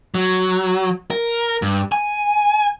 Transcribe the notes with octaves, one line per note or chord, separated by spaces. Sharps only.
F#3
A#4
G2
G#5